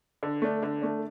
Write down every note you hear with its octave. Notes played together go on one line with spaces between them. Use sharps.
D3
A3 D4
D3
A3 D4